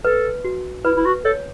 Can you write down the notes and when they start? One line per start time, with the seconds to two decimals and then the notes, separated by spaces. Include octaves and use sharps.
0.05 A4 B4
0.45 F#4
0.85 E4 B4
0.96 E4
1.06 F#4
1.25 A4 C#5